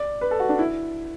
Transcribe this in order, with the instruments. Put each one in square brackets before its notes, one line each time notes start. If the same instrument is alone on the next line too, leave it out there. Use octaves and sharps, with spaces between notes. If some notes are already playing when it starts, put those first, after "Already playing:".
Already playing: [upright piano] D5
B4
A4
F#4
D4
E4